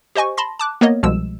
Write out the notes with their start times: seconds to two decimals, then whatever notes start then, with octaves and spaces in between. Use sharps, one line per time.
0.15 G4 C5 D#5 G#5 C#6
0.37 A5 B5 C6 A#6
0.59 A5 D6 F#6
0.81 A#3 B3 A#4 C#5 D#5
1.03 C2 B2 F3 G#3 E6 E7